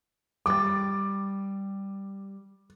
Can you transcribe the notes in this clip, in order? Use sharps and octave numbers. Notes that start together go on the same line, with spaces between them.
G3 G5 D6 A6